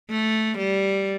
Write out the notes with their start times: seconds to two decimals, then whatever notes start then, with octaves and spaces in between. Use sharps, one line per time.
0.10 A3
0.58 G3